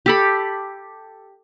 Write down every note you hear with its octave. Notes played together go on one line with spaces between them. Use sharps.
G4 A4 B5